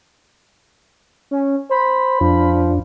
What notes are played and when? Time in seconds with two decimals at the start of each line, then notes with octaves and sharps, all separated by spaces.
1.31 C#4
1.71 C5 B5
2.21 F2 F3 D4